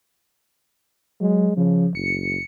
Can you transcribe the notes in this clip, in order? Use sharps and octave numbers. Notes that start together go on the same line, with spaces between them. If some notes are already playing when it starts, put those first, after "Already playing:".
F#3 G#3
C#3 F3
F#1 C#7